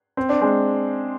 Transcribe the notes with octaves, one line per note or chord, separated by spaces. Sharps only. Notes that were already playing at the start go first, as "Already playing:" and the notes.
C4
D4
G#3 C4